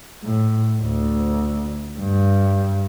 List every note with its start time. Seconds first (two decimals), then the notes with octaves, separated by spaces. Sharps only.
0.25 A2
0.82 D2
2.00 G2